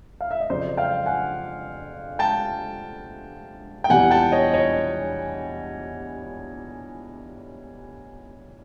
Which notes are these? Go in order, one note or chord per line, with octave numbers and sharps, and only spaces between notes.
F5
E5
D#5
F2 C#3 F#3 C5 D5
F5 G5
F#5 G#5
G5 A5
G5
E2 C3 E3 G3 F#5 G#5
G5 A5
C#5 D#5
C#5 D#5